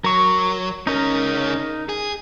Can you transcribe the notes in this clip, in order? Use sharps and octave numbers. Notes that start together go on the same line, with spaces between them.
F#3 A#4 C#6
C#2 C#4 D#4 A#4
G#4